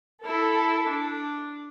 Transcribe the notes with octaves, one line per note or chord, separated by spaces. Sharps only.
E4 A4
D4